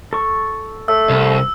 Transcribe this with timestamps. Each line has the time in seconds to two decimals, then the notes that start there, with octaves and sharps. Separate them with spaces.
0.13 A4 C#6
0.88 A3 E6
1.09 C2